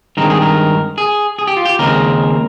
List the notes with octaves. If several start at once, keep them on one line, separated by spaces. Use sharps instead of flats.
G2 D#3 G#3 C4 A#4
G#4
A#4
G#4
G#4
G4
F4
G4
D#2 C#3 G#3 C4 A#4